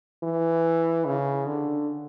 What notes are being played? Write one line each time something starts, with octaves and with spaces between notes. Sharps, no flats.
E3
C#3
D3